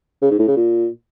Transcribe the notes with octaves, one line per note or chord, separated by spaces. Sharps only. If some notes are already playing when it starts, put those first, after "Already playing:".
C#3
G#2
A2
C#3
A#2